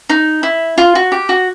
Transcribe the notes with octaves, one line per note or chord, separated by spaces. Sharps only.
D#4
E4
F4
F#4
G4
F#4